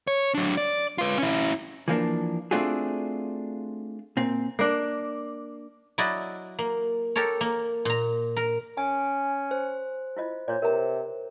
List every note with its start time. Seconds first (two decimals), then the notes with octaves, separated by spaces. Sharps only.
0.07 C#5
0.35 F#3 D4
0.57 D5
0.98 F4 B4
1.18 C#4 E4
1.88 E3 F3 A#3 D4
2.51 A3 C4 D4 F4 F#4 G#4
4.17 A#2 C4
4.59 A#3 D4
5.98 F#3 E4 F#4 D5 D#5
6.59 A#3
7.16 G4 A4 A#4 C#5
7.41 A#3
7.85 A#2 A#5
8.37 A#4
8.77 C#4 G#5
9.51 C5
10.17 E4 F4 D#5
10.48 A#2 C#5 D5
10.62 C3 A#4 B4 A#5